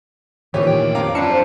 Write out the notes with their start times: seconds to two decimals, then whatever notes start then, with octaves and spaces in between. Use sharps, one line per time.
0.54 A#2 D#3 E3 E4 G4 C#5
0.67 D2 G5
0.95 F2 D4 C#5 F5 A#5 D6
1.15 G3 D4 E4 F4 A5 C7 C#7
1.28 G#3 C5